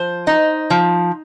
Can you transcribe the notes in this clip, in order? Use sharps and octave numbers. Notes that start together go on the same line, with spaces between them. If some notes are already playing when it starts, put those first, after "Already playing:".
Already playing: F3 C5
D#4
F3